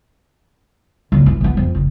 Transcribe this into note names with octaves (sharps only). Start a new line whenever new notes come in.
F#1
E3
A#3 B3
F2
F#1